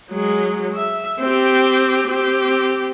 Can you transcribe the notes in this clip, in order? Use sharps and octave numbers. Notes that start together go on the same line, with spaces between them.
F#3 G#3
E5
C4 G4
C4 G4